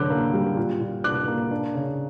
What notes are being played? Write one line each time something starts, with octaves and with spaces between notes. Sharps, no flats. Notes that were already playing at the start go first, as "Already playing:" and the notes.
Already playing: D3 F#3 C#4 D6 E6 F#6 G6
A#3
G3
A#2
A#2
D4 D6 F#6
A#3
D4
C#3